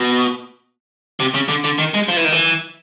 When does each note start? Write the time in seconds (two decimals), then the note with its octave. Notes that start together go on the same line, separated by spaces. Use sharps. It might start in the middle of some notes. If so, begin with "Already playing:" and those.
Already playing: B2
1.20 C3
1.34 C#3
1.48 D3
1.64 D3
1.79 D#3
1.94 G#3
2.08 F3
2.17 E3
2.25 D#3
2.32 E3